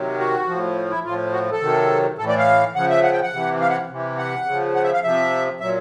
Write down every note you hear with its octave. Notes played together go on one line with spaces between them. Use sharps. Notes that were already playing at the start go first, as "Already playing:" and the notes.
Already playing: C3 D#3 F#3
F#4
A2 F3
E4
A2 F3 F4
F#4
A4
C3 D#3 F#3
A2 E3 A4
D5
F5
C#3 F3 F#5
E5
F#5
G5
F#5
C3 E3
F5
F#5
C3 E3
F#5
C#3 F3
F#5
E5
F5
C3 F3 E5
A#2 F#3 E5